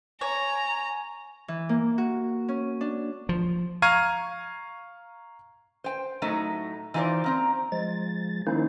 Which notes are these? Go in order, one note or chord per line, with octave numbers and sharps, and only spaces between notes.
C#5 G#5 A#5
E3
A#3
F#4
C#4
D4
F3
F5 A#5 C#6 F6 G#6 D#7
C5 G5
A2 F#3 A3 D#4
E3 D#4 F4 G4 C5 D5
A#3 C4 A#5
F3 G#3 A6
D#3 A#3 C#4 D#4 E4 C5